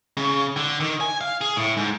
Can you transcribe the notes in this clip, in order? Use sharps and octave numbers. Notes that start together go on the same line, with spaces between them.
C#3
D3
D#3
G#5
F5
G#4
A2
G#2